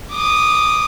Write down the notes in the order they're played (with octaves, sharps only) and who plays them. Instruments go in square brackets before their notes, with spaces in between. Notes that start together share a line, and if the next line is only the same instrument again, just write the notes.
[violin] D6 D#6